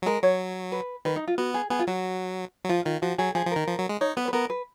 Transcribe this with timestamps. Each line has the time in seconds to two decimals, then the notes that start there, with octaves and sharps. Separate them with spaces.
0.02 F#3
0.06 G#3 A#4
0.23 F#3 C#5
0.72 B4
1.05 D#3 B4
1.16 D#4
1.28 F4
1.38 B3 F#4
1.54 G#4
1.70 B3 G#4
1.79 F4
1.87 F#3 F#4
2.65 F#3
2.69 F3 F4
2.85 D#3 F4
3.02 F3 F#4
3.18 F#3 G#4
3.35 F3 G#4
3.46 F3
3.51 D#3 A#4
3.68 F3
3.79 F#3
3.89 G#3
4.01 D#4 C#5
4.17 B3 B4
4.28 B4
4.33 B3 A#4
4.50 B4